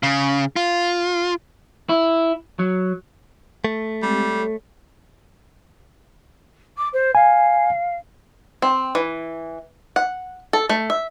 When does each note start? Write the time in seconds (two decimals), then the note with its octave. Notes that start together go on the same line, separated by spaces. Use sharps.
0.03 C#3
0.56 F4
1.89 E4
2.59 F#3
3.65 A3
4.03 G3 G#3 C4 G4
4.21 A4 C#5
6.77 D6
6.93 C5
7.15 F5 G#5
8.62 C4
8.95 E3
9.96 F#5
10.53 A4
10.69 A3
10.90 E5